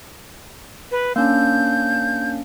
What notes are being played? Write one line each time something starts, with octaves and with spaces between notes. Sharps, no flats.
B4
A#3 C#4 D4 G6